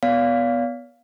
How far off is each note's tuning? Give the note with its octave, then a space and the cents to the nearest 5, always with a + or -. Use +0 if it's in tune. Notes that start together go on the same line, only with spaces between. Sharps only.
B3 +0 D5 -45 F5 +0